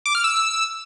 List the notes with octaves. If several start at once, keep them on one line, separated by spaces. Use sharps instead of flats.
D6
F6
E6